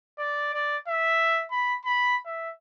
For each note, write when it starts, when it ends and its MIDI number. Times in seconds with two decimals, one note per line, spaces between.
0.18 0.51 74
0.54 0.77 74
0.88 1.45 76
1.51 1.75 83
1.85 2.16 83
2.26 2.50 76